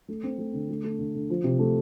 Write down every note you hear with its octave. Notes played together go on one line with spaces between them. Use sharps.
A3
C4
A3
D3
A3
A3
D3
D3
F3
C3
A3